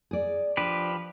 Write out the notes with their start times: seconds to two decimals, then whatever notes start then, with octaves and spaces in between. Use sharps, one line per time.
0.11 G#4 D5
0.57 F3 D4 G4 B4